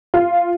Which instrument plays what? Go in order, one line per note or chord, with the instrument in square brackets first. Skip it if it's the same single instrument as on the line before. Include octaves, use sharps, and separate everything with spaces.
[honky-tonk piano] F4